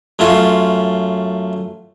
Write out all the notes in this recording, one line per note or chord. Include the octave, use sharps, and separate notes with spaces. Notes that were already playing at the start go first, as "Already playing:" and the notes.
F#2 A3 C#4 F4 C6